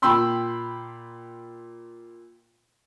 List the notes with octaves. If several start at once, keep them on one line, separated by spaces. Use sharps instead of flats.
A#2 G5 B5 C6 E6